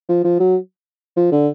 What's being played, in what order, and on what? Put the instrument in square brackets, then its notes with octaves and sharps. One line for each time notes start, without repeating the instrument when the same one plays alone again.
[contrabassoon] F3
F3
F#3
F3
D3